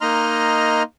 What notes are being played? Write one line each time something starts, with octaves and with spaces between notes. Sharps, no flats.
A#3 D#4 D#5 A#5 C6 F6